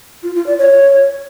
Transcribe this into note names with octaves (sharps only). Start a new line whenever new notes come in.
F4
F4
D5
C#5